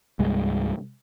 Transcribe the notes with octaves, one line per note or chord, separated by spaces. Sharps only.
C2 G2 G#3